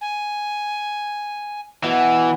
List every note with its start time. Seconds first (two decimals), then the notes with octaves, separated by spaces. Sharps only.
0.01 G#5
1.84 B2 E3